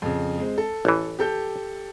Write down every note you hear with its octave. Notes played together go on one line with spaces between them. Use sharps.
F2 C#3
G#3 C4
A4
A1 E3
G4 A4 G6